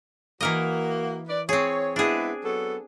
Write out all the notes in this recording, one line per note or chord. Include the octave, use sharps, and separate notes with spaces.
E3 A#3 F#4 A#4 D#5
B4 D5
C4 G#4 C#5
G#3 B3 D4 E4 G#4
F#3 B3 A4